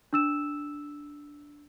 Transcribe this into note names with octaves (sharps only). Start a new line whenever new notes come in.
D4 E6 E7